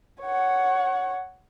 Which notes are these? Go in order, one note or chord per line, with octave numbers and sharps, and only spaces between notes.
C#5 F#5